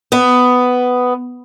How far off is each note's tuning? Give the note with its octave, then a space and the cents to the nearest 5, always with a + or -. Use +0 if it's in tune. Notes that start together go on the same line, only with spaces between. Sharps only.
B3 +10